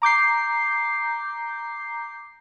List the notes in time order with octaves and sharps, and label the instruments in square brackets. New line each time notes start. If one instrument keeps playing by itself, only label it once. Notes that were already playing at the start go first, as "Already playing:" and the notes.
[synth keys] A#5 D6 G6 C7